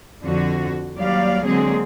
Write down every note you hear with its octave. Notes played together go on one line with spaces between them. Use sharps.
F2 D3 F#4
D#2 F#3 G3 D5 F5
D3 F#3 G#3 A#3 C4 G#4